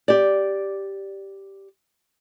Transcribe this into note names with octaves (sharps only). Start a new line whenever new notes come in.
G4 D5